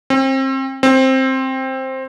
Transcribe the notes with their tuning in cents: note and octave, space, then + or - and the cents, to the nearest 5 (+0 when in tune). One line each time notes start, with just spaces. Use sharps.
C4 +30
C4 +10